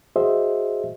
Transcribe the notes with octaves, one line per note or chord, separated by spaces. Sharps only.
F#4 G#4 C5 D#5 E5